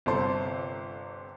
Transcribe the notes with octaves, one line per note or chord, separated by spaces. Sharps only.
G1 C3 A4 C5